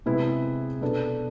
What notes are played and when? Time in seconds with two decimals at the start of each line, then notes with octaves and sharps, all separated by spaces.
0.06 C3 G#3 B3 E4 G#4
0.81 B2 B3 D4 A4